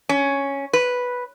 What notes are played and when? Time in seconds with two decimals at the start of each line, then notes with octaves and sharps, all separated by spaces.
0.09 C#4
0.73 B4